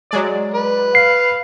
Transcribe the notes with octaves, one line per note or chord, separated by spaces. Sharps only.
F#3 G#3 D5
B4
F5 C7